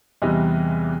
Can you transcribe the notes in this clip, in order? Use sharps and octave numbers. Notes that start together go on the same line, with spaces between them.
E2 C3 E3 G3 D#5